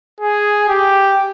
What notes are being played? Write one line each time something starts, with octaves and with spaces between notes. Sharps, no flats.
G#4
G4